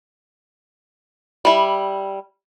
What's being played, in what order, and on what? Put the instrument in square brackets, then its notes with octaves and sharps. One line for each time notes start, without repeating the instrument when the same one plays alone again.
[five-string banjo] G3 E4